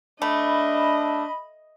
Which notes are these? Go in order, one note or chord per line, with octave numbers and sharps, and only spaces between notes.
A3 D4 D#5 B5